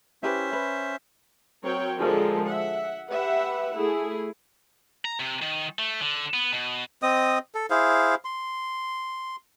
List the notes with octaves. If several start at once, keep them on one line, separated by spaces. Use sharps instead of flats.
C#4 E4 G4 B4 C5 E5
B4
F#3 C4 A#4 C#5 G5
D3 F3 G#3 G4 A4 A#4
E5 F#5
G4 B4 E5 F#5
A3 E4 G#4
A#5
C3
D#3
A3
D3
B3
B2
C4 D#5 D#6
A4
E4 G#4 C5 F5
C6